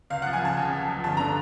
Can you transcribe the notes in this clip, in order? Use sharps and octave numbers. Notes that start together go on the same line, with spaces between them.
C#2 F5
F3 F#5
G#5
C#3 A5
C#2 G#5
C#2
F3
G1 A5
D3 A#5